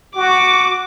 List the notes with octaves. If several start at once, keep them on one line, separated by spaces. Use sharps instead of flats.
F#4 D6